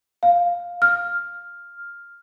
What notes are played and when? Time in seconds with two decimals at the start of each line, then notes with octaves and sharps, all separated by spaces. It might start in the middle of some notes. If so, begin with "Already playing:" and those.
0.23 F5
0.82 F6